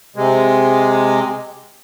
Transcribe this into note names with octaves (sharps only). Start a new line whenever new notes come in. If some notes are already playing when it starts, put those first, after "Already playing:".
C3 G#3